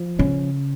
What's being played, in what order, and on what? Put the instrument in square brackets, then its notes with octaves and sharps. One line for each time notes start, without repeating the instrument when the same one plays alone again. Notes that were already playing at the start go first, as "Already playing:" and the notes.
Already playing: [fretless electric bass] F3
[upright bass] C#3 [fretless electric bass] C#4